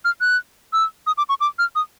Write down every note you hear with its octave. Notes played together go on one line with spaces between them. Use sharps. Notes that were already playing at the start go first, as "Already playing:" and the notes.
F6
F#6
E6
D#6
D6
C#6
D6
F6
D#6